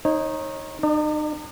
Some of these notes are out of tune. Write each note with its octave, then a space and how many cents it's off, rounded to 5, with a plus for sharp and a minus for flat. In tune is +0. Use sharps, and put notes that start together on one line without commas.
D#4 +0 C#5 -30
D#4 -40 D5 +25